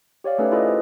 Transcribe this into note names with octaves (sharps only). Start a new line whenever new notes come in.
G4 C#5 D5 F5
A3 C#4 D#4 G4 A4 B4
E4 F4 G#4 A4 B4 D#5
C5